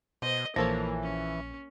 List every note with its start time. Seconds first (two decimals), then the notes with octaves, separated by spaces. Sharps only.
0.22 B2 C5 D#5
0.56 A#1 E3 F3 A#3 A4 C#5 A#6
1.03 C#4